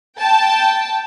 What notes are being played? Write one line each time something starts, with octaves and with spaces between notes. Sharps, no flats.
G5 A5